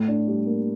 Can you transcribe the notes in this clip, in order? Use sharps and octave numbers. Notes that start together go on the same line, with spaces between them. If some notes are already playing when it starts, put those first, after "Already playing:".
Already playing: A2
D4
G3
A#3